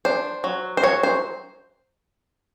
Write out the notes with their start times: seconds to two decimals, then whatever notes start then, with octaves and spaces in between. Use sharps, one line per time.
0.05 D4 C5
0.44 F#3
0.77 C5
0.83 F#3 C#5
1.03 C5